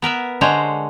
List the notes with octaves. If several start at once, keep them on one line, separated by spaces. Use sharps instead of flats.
B3 A#4 B4 E5
D3 G#3 C5 C#5 F#5 A#5